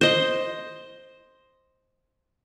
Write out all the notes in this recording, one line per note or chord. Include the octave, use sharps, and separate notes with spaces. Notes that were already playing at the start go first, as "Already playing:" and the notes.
C5 D#5